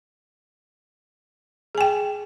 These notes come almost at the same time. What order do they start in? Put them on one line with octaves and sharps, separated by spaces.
G#4 G#5 G5